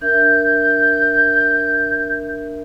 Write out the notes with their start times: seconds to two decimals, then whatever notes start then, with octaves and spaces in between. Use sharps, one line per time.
0.01 D4 A#4 E5 G6